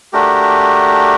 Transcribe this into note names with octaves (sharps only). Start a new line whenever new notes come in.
A3 D4 F#4 G4 A#4